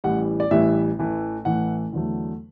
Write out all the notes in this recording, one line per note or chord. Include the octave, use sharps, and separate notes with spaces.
A1 A2 E3 G3 F#5
D5
A1 A2 E3 G3 E5
A1 A2 E3 A3
A1 A2 E3 A3 F#5
E2 D3 F#3 A3